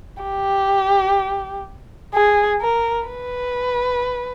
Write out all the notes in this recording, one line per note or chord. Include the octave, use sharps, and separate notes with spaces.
G4
G#4
A#4
B4